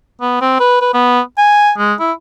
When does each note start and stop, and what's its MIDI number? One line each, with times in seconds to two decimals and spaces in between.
0.21 0.38 59
0.41 0.55 60
0.60 0.79 71
0.81 0.91 71
0.94 1.21 59
1.38 1.72 80
1.78 1.93 56
1.99 2.12 64